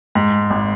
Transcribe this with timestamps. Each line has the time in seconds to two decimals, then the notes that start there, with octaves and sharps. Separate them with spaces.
0.15 G#2
0.50 G#1